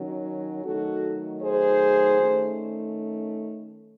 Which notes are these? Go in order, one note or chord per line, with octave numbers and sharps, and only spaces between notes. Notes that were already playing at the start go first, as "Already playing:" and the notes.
Already playing: D#3 F#3 C#4
D#3 F#3 A3 D#4 F#4 A4
G#4 C5
D#3 A3 C#4